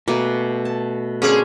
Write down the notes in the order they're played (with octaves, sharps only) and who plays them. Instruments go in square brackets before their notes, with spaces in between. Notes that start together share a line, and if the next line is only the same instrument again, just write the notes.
[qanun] B2 [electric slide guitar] A3 [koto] A#3 G#5
[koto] A5
[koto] D3 C4 C#4 [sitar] A#3 G#4